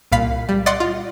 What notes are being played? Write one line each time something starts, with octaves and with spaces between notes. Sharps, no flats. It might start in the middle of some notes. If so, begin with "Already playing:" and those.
C2 A#2 F5 B5 C7
G3
D5 D#5 F#5 C6
F4